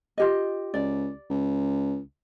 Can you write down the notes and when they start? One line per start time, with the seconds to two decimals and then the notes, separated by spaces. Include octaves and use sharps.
0.18 F4 G4 D#5
0.74 C#2 D5
1.30 C#2